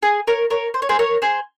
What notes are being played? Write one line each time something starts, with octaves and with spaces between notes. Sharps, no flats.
G#4
A#4 C#5
A#4 C#5
C5
C#5
G#4 C5
A#4 C#5
G#4 C5